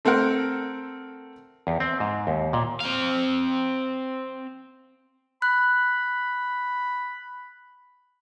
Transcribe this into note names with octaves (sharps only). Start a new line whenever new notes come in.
A3 C4 A4 A#4 F#5
E2
C4
G#2
D#2
A#2
C4 F5
B5 F#6